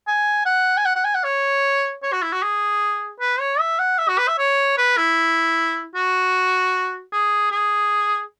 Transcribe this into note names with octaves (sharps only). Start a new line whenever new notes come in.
G#5
F#5
G#5
F#5
F#5
G#5
F#5
C#5
C#5
F#4
E4
F#4
G#4
B4
C#5
E5
F#5
E5
F#4
B4
E5
C#5
B4
E4
F#4
G#4
G#4